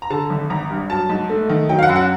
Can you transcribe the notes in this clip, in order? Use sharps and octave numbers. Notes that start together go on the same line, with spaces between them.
A#5
D3 A5
G#1
G#1 A#5
G2
F#3 A5
G#2
A3
D#3
F#3 G5
F5
F#5
F#2
F#5